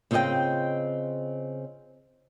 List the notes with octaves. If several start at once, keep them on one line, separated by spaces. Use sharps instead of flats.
C#3 C4 F4 C#5 D#5 G5